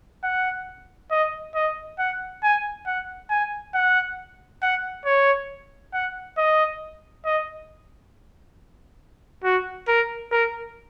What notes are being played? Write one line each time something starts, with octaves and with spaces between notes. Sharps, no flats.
F#5
D#5
D#5
F#5
G#5
F#5
G#5
F#5
F#5
C#5
F#5
D#5
D#5
F#4
A#4
A#4